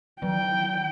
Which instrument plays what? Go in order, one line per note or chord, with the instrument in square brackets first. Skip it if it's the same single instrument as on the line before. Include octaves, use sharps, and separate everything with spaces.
[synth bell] D#3 F#3 [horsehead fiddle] G5